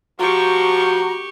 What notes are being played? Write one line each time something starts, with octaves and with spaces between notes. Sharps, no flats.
F3 F#4 G4 A#5 C#6